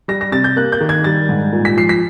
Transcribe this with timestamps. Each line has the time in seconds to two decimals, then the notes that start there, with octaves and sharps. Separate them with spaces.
0.08 G3 A#6
0.21 A#6
0.32 C3 A6
0.44 G6
0.56 A#3 F#6
0.72 G6
0.81 D#3
0.89 G#6
1.04 G3 A6
1.29 G#2
1.53 A#2
1.65 B6
1.77 F3 C7
1.89 B6